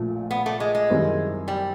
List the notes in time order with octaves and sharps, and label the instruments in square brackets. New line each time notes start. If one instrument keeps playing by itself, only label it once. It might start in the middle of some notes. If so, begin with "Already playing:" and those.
Already playing: [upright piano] A#1 A#2 F3 A3
[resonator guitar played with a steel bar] B3
A3
G#3
G#3
[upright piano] F#2 D#3 G3 C4 E4
[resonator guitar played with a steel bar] G3